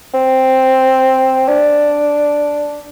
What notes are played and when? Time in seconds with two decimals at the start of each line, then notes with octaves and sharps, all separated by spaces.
0.14 C4
1.48 D4